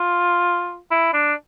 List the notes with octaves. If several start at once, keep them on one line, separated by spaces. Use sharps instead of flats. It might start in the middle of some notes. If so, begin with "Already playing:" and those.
Already playing: F4
E4
D4